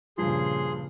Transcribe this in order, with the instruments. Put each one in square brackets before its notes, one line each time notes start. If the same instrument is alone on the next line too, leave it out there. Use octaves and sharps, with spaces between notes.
[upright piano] G2 F3 [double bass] A#2 C#3 [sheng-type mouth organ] G#4 C6